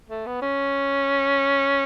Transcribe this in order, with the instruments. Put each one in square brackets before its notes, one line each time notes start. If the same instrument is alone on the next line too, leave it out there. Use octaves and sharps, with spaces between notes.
[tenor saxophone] A3
B3
C#4